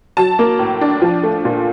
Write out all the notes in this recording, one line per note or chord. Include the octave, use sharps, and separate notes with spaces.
F#3 A5
A#3
A2
D4
F3
A3
A#2